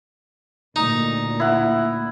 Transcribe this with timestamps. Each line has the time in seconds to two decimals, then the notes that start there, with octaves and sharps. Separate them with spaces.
0.76 D2 A#2 D#4
1.40 E4 F#5